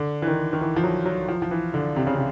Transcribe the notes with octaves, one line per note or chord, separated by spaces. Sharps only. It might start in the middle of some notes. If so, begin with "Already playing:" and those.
Already playing: D3
E3
D#3
D#3
E3
F3
F#3
F#3
F3
F3
E3
D3
C3
C#3
C3